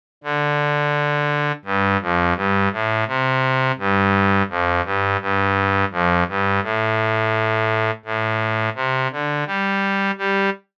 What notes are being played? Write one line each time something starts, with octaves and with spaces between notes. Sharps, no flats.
D3
G2
F2
G2
A2
C3
G2
F2
G2
G2
F2
G2
A2
A2
C3
D3
G3
G3